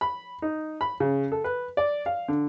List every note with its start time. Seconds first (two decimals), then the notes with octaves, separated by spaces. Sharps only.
0.01 B5
0.42 D#4
0.81 B5
1.00 C#3
1.32 A4
1.44 B4
1.77 D5
2.06 F5
2.28 D3